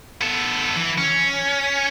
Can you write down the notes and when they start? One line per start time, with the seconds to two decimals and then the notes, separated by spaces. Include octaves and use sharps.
0.21 B3 A4
0.76 E3
0.98 C#4